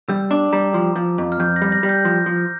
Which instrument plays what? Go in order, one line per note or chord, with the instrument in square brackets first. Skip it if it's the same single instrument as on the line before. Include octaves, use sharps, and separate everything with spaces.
[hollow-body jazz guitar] G3 [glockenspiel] E6
[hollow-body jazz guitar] D4 [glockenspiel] D6
[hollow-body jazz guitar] G3 [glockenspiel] A#5
[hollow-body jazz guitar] F3
F3
F2
[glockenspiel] F6
[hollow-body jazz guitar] F2 [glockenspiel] G6
[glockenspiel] A#6
[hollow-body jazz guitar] G3
[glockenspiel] A#6
[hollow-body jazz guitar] G3
[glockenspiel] G6
[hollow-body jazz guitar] F3
F3